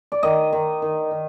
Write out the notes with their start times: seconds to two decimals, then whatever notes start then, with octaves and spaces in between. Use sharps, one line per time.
0.12 D5
0.23 D#3 D#5
0.53 D#3
0.82 D#3
1.11 D#3